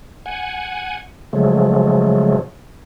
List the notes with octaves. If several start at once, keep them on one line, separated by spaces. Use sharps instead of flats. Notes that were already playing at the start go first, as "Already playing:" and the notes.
F#5 G#5
C#3 F3 F#3 G#3 A3